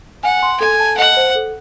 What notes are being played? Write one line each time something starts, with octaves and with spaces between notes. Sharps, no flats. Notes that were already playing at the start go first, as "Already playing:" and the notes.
F#5 G#5
C6
A4 G#5
A5
D#5 F#5
C5
A4